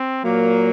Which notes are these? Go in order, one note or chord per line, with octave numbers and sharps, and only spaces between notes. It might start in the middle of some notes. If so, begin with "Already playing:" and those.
Already playing: C4
A#2 F#3 A#3